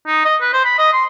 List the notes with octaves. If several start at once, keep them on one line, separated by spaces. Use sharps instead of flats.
D#4
D#5
B4
C5
B5
D#5
C6